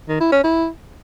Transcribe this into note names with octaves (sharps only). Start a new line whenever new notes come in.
D#3
E4
C#4
E4